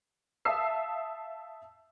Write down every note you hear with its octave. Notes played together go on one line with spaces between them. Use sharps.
E5 F5 A5 D#6 E6 C7